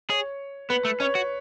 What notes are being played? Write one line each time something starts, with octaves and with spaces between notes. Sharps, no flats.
G#4 C#5
B3 B4
A3
C#4 C#5
F#4